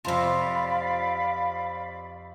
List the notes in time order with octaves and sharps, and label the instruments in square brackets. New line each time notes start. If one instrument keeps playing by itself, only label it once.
[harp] F2 A5 [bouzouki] C3 F4 [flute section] D5 F5 B5